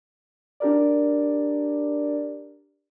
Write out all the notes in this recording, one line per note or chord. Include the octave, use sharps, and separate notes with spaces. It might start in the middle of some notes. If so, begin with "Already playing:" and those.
D4 G4 A#4 D5